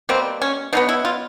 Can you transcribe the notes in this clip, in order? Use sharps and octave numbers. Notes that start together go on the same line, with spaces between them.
B2 G3 A#3 C4
C#4
B2 F#3 B3 D#4
E4
F4